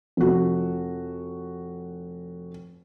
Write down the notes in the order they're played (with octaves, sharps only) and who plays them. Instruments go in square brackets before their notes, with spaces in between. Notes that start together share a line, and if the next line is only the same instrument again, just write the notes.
[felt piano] F1 F#4